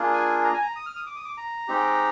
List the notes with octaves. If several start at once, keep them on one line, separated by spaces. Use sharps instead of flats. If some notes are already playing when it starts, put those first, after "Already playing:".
Already playing: A#3 D4 F4 G#4
G#5
A#5
G#5
A#5
D#6
F6
D#6
D6
D#6
D6
A#5
G#3 C4 D#4 G4